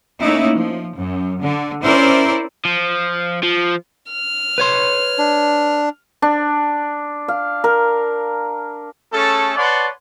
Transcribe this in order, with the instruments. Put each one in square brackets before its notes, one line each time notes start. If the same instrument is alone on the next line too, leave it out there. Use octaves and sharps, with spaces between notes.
[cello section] A3 A#3 C#4 D#4 E4
F3
F#2
D3
C#4 E4 A#4 C5 D5
[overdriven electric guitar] F3
F3
[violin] F6
[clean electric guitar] B4 C#5 C6
[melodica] D4
[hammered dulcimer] D4
F5
A#4
[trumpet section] A3 C#4 G#4 A4
B4 C#5 D5 F#5 A5 C6